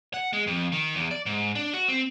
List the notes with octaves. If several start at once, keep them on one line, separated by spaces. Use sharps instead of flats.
F#5
G#3
F2
D#3
E2
D5
G#2
D4
F#4
C4